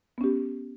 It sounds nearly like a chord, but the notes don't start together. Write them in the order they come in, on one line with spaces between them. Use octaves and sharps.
B3 C#4 G4